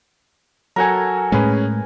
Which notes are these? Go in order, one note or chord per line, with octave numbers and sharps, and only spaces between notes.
F#3 F#4 A4 A#4 G#5
A2 G#3 C#4 G#4 B4